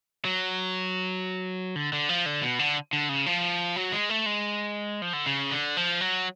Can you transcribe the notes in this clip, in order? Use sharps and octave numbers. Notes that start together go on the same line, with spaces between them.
F#3
D3
D3
F3
D3
B2
D3
D3
C#3
F3
F#3
G#3
A3
G#3
F3
D3
C#3
D3
F3
F#3